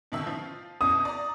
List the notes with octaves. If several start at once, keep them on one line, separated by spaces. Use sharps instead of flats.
B2 D#3 E5
F3 F4
C2 B2 D#6
D5 A#5